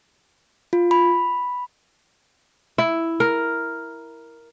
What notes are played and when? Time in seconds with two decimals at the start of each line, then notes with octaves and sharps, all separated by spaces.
0.73 F4
0.91 B5
2.78 E4
3.20 A#4